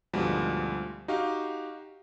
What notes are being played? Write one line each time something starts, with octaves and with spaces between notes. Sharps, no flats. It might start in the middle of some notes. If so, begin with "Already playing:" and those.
D2 G#2 B2 F3 G3
D#4 F#4 G4 F5